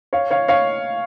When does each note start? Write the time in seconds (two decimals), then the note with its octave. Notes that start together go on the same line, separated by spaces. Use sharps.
0.13 C#5 F5
0.31 C#5 F5
0.48 C#5 F5